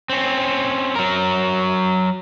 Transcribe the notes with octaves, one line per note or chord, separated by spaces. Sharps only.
C4 C#4
F#3 A#4